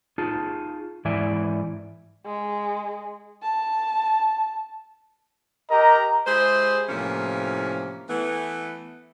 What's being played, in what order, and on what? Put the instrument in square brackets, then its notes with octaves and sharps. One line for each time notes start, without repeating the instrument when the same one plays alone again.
[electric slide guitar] D#4 F4 G#4 A5
G#2 E3 E4 D5 E5 G#5
[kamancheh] G#3
A5
[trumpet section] G4 A#4 D#5 [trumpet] A#5
[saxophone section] G#3 E4 G4 G#4 C5
A2 C3 E3 F3 A#3 C#4
E3 A3 B3